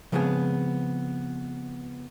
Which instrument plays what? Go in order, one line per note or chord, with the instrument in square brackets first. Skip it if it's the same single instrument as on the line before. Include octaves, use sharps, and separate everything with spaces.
[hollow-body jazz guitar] C#3 F3 G#3 B3 C4 G#4